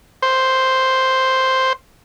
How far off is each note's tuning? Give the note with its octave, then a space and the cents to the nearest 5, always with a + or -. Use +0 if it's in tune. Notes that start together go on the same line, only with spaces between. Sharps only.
C5 +0